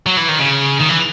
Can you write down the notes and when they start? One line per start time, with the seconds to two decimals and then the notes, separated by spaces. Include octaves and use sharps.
0.06 F#3
0.17 E3
0.29 D#3
0.39 C#3
0.81 D#3
0.90 E3